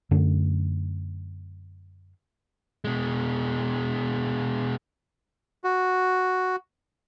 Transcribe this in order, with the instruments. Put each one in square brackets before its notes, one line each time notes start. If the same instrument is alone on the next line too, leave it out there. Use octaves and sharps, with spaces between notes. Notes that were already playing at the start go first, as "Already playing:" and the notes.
[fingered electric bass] F#2 D3 A3
[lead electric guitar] B2 G#3
[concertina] F#4